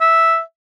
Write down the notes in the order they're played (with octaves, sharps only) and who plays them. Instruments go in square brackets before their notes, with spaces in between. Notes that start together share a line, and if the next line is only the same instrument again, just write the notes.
[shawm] E5